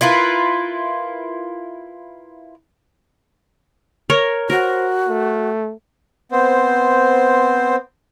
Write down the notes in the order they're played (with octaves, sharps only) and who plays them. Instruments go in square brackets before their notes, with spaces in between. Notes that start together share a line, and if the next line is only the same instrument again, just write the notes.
[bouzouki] E4 F4 A#4 B4
[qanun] A#4 C#5
[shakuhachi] F#4 [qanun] A#4 [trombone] C5
[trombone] A3
[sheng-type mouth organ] B3 C4 C5